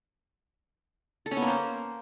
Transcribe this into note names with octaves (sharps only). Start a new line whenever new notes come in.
A4
C#4
B3
A#3
C5